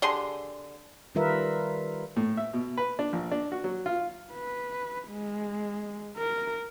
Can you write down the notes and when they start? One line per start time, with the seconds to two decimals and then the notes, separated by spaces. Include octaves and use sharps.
0.02 D3 G4 G#4 C6
1.15 D#3 G3 F4 A#4 B4 E5
2.16 A2
2.37 E5
2.53 B2
2.77 B4
2.99 D4
3.13 A#1
3.31 D4
3.52 F#4
3.64 F#3
3.86 F4
4.32 B4
5.08 G#3
6.17 A#4